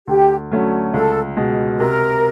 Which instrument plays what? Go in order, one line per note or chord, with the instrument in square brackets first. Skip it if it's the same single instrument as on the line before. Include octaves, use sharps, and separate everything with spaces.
[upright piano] D2 [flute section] G4
[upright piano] D3 F#3 A3 C#4
[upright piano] C#2 [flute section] A4
[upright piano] B2 G#3
[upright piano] C3 [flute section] A#4